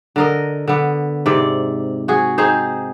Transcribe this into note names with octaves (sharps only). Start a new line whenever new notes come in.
D3 A#4 D#5
D3 B3
G#2 C3 D5
F#4 G#4
C4 D#4 G#4 C5